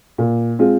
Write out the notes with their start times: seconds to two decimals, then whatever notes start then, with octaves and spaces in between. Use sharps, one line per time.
0.18 A#2
0.59 G#3 C4 F4